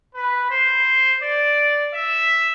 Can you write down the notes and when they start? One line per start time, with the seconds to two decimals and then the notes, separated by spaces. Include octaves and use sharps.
0.14 B4
0.51 C5
1.22 D5
1.93 E5